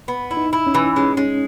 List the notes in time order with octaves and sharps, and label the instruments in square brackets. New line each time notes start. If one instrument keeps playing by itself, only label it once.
[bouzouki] B3
E4
[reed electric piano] D#4
[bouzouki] E4
[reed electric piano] C#4
[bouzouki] E3
[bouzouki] G#3 [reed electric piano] C#4
[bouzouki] G#3 [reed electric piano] C#4